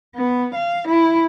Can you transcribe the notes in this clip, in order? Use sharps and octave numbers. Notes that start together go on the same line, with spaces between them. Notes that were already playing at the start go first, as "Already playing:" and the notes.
B3
F5
E4